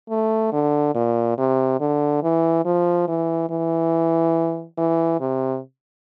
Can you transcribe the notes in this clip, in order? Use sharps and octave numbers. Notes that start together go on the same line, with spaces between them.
A3
D3
A#2
C3
D3
E3
F3
E3
E3
E3
C3